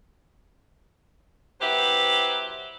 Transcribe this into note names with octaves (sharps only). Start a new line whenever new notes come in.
F#3 B3 E4 G4 C5